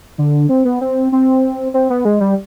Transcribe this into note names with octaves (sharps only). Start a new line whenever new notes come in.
D3
C4
B3
C4
C4
C4
B3
G#3
G3